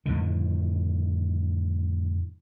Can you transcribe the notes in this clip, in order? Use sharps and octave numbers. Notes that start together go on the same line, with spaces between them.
F2 A2 D3 D#3